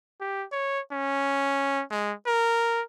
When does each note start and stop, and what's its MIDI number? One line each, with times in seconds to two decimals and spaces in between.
0.20 0.45 67
0.52 0.80 73
0.92 1.82 61
1.91 2.12 56
2.26 2.81 70